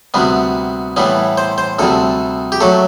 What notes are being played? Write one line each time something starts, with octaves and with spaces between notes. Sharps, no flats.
D2 C3 G3 B3
A2 E3 G3 B3
C5
C5
D2 C3 G3 A4
G4
F#3 A3 A4